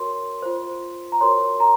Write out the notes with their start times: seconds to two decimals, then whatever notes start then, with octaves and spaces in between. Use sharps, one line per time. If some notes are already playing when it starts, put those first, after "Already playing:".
Already playing: F#4 A#4 C#5 C6
0.42 F4 C5
1.12 A#5
1.21 F#4 A#4 C#5 C6
1.60 A#5